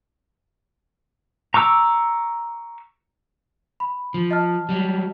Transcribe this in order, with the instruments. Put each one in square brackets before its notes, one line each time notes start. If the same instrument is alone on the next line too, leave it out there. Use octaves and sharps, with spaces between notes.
[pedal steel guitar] A#5 C#6 D6 E6
[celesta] B5
[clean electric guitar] F3
[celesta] D#5 A5 F6
[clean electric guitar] F#3 G3